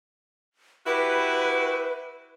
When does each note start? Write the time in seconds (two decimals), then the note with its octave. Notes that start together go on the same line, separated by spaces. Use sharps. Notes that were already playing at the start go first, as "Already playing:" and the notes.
0.86 E4 F#4 G4 B4